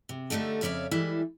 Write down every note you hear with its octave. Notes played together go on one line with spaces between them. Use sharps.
C3
D3 G3 A3 D#4 A4
F2 C#3 C#5 D5 E5 F5
E3 G3 G#3 E4 A4